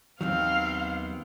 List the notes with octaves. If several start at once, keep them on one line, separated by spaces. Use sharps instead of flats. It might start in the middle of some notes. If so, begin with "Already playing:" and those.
D#2 D#3 F#3 B3 C4 F5